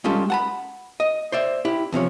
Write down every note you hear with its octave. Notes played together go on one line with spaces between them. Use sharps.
G3 G#3 C#4 F4 G4 A4
F#5 A5 B5
D#5
C5 D5 E5
E4 G4
E2 C3 F3 C#5